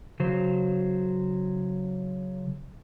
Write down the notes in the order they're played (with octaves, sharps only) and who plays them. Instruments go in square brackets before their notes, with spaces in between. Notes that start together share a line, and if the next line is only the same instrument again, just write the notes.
[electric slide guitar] C#3 F#3 C5